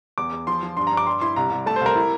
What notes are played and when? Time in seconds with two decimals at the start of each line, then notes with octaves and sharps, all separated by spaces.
0.18 E2 D6
0.32 E2
0.47 F3 C6
0.63 F3
0.77 G2 C6
0.87 A#5
0.92 G2
0.97 D6
1.07 G3 C6
1.21 E4 C6
1.36 C2 A#5
1.51 C2
1.66 A3 A5
1.76 C5
1.81 C2 A#4
1.96 E4